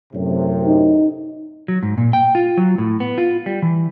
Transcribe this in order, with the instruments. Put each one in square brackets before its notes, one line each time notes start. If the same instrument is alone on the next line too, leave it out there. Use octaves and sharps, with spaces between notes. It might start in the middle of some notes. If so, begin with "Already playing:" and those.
[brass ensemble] F#2 A2 C3
[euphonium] D#4
[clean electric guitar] F#3
G#2
A#2
G5
F4
F#3
A2
B3
F4
G3
E3